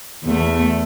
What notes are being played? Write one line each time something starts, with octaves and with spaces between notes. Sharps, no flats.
E2 A3